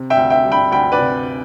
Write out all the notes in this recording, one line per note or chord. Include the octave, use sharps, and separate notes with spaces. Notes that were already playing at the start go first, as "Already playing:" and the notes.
Already playing: C3
E5 G5
D2
E5 G5
G3
G5 B5
D2 G5 B5
B4 D5
C3